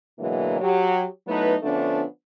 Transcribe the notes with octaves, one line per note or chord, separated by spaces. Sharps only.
B2 D3 E3 F#3 G#3 A#3
F#3 G4
F#3 A3 B3 D#4 E4 B4
D3 F3 A3 B3 C#4 D4